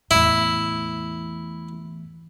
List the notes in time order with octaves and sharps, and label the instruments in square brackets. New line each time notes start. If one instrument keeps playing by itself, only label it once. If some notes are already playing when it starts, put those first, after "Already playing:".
[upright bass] E2 A2 [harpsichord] E4